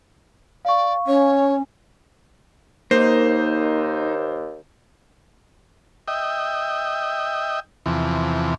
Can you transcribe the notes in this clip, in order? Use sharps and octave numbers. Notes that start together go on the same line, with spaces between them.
D5 F5 C#6
C#4 C#5
D#2 A#3 D#4 C5
D#5 E5 G5
E2 C3 E3 F3